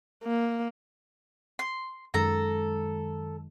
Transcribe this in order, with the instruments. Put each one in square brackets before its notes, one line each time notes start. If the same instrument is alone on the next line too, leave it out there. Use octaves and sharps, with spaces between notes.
[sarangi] A#3
[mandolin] C6
[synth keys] F#2 D#3 G#3 [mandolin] A4 A#5